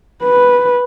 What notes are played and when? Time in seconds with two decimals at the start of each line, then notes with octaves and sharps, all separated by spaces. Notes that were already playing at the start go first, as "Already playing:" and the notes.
0.23 B4